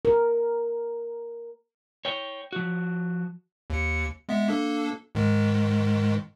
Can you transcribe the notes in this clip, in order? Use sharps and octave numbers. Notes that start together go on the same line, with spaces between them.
A#4
C#5 G5
F3 F#4
D#2 C#7
G#3 B3 E5
A#3 D4 A4
G#2 D#3 G#3